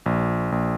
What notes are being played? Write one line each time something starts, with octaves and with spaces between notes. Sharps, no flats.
A#1
A#1